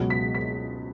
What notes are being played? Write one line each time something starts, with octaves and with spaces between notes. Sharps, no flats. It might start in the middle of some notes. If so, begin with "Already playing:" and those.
Already playing: C#2 B2 F#3
B6
B6